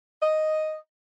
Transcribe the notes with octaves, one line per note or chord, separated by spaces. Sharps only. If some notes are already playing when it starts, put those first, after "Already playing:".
D#5